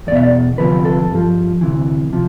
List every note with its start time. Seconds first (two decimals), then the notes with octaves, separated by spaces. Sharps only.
0.07 E2 D5
0.12 B2 E5
0.23 D5
0.58 D2 C3 F3 B4
0.85 A4
1.10 G2 F3
1.61 D2 C3 E3
2.13 C3 F3